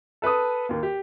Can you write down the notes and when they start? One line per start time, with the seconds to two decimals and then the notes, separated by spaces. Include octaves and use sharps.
0.22 A4 B4 A5 D#6
0.69 D#2 A#3
0.83 G4